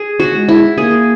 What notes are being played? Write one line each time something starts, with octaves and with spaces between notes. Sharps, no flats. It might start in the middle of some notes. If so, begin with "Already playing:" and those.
Already playing: G#4
F#4
G#3
E4
A#3 G#4